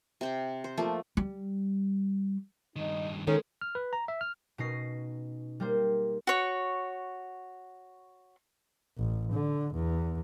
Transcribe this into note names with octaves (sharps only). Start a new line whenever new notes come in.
C3 C5 G5
C5
F3 A3 A#3
G3
G2 D#3 D#4
D#3 G#3 C#4 A4 A#4
F6
B4
A#5
E5
F6
B2 C#4 D#4 A#6 C7
G3 A#3 C5
F#4 C#5
A1
D3
E2